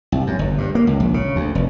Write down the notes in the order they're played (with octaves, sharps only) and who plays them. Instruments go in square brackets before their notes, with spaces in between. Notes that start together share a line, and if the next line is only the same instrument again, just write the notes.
[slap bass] C2
F#2
G1
G2
A#3
C#2
A#1
C#3
D2
F1